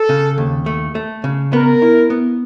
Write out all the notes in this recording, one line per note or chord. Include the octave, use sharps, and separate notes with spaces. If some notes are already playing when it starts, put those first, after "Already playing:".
Already playing: A4
C#3
D#2
A3
A3
C#3
B3 A#4
E4
B3